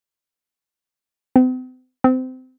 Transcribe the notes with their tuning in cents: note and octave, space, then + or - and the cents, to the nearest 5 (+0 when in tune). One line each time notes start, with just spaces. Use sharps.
C4 -45
C4 -25